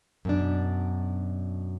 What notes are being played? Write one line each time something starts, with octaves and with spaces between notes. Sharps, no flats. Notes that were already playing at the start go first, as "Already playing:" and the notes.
F#2 B2 D4